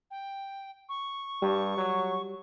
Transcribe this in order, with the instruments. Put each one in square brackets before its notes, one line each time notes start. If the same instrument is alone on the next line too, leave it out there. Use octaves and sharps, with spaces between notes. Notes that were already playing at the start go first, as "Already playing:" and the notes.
[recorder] G5
C#6
[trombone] G2 [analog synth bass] G3
[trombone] F#3